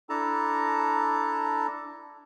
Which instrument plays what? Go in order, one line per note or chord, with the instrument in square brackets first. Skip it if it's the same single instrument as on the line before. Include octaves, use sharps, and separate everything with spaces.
[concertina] D4 E4 A4 A5 A#5